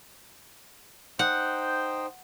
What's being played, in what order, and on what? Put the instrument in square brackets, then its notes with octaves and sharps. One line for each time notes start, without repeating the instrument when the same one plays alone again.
[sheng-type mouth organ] D#4 C5 G5 [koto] F#5